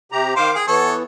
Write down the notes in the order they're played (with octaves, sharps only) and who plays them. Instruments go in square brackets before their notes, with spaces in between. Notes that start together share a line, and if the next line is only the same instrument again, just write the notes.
[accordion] C3 G4 A#5
[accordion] D#3 F5 D6 [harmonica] C5
[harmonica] G#4 [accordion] G5
[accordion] E3 B3 [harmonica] A4 C#5